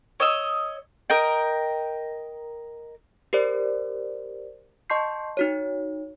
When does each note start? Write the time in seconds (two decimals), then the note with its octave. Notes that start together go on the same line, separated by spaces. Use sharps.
0.20 C#5 D#5 E6
1.10 A#4 D#5 G5
3.33 G4 A#4 C5 D5
4.90 D#5 A5 C6 C#6 G6 C7
5.37 D#4 F#4 C#5